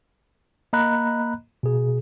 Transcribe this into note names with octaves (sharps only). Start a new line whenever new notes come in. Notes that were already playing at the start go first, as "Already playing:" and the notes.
A#3 D#5 A#5 B5 F#6
B2 G#4